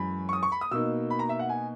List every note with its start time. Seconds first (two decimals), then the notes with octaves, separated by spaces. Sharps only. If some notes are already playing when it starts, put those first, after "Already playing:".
Already playing: F#2 E3 G#3 C#4 B5
0.29 C#6
0.33 D#6
0.43 C#6
0.52 B5
0.61 D#6
0.71 B2 A#3 D#4 E6
1.10 B5
1.19 A#5
1.29 E5
1.39 F#5
1.49 G#5